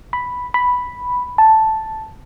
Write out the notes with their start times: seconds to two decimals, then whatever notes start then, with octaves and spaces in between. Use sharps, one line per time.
0.13 B5
0.54 B5
1.38 A5